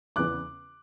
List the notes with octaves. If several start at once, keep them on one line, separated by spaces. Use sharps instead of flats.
E2 C#3 E3 B3 D6 F#6